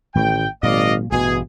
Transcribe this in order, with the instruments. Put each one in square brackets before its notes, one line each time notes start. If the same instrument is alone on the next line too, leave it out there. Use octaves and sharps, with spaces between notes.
[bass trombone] A1 [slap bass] A2 D#3 E3 [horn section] G5
[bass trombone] G#1 [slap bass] A#2 F#3 [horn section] D5 D#5 F5
[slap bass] A1 G2 [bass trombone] B2 [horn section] G#4